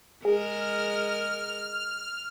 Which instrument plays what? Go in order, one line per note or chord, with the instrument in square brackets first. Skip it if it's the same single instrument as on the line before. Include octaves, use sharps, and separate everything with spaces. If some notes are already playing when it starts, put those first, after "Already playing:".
[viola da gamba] G#3 A#4 [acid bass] G#4 [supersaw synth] F6